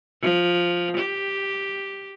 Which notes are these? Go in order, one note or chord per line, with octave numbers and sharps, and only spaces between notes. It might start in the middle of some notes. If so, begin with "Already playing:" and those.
F3
G4